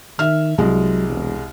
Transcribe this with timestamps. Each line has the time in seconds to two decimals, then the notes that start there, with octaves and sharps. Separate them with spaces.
0.19 D#3 E5 F6
0.58 C2 F#3 G#3
1.09 E1